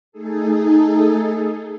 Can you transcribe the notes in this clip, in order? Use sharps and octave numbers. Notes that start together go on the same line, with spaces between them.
A3 D#4 G#4 A4